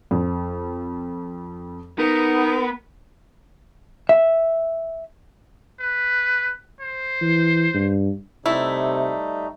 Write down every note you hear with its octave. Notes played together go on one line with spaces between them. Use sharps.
F2
B3 D#4 A#4
E5
B4
C5
E3
G2
C3 G3 A3 D#4 E4